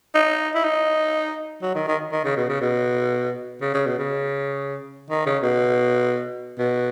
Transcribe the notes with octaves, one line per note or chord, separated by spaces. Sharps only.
D#4
E4
D#4
F#3
D#3
D#3
D#3
C#3
B2
C#3
B2
C#3
C#3
B2
C#3
D#3
C#3
B2
B2